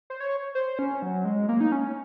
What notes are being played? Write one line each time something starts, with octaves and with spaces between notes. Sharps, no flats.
C5
C#5
C5
C#4
F#3
G#3
A#3
D#4
C#4